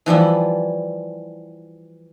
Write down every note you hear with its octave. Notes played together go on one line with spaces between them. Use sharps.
E3 F3 G3 E4